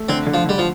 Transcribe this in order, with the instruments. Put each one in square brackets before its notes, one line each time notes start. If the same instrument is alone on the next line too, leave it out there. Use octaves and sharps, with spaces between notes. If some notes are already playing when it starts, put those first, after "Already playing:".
Already playing: [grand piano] A3
[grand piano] D3 [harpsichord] C4
[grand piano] D3
[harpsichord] F3
[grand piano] D3 [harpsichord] G3
[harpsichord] F3